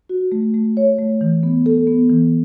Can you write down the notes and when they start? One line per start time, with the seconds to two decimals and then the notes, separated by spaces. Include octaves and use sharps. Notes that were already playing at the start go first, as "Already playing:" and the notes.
0.09 F#4
0.32 A3
0.54 A3
0.77 C#5
0.99 A3
1.21 E3
1.43 B3
1.66 A4
1.87 B3
2.10 E3